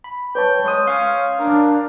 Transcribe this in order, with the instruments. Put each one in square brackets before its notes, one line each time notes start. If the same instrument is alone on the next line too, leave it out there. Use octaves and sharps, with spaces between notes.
[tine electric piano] B5
[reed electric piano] B4 C#5 A5 [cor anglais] G5
[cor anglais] G#3 [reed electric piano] C#5 C6 D#6
[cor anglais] C#4 [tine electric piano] F5 G6 C7
[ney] D4 [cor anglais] A#4